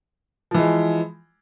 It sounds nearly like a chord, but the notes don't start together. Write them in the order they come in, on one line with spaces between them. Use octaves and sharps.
F3 E3 G#3